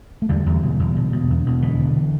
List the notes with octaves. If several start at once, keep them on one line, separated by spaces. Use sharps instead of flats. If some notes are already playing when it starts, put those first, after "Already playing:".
A3
E2 D3 G3
E2
B2
E2
B2
B2
E2
B2
D3 E3
D3